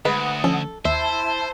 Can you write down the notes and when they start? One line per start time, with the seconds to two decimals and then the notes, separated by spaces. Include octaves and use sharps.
0.05 D2 G#3 B4 F#5 D#6
0.44 F3 C#4 A4
0.85 D#2 E4 C5 E5 A5